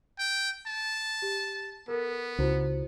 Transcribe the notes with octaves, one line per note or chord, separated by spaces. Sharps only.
G5
A5
G4
B3 A4 A#4
C#2 E4 F#4 C5